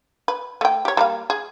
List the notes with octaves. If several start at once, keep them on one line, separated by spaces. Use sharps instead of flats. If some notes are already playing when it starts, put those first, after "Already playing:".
B4
A3 G5
G4 C#5
G3 A#3 F5
G#4